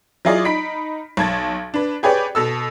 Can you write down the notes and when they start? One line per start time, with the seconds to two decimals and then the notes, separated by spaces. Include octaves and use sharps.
0.25 F#3 E4 F4 G#4 D5 D#5
0.45 D#4 B5 B6 D7
1.17 B1 A5 G#6 A6
1.74 D4 B4
2.03 G4 G#4 B4 C#5 D5 G5
2.35 B2 A4 E6